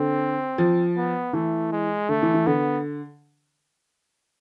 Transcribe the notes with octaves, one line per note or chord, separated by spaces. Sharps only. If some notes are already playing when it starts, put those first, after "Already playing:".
Already playing: D3 C4
F3
B3
E3 A3
G#3
D3 A3
E3
E3
D3 B3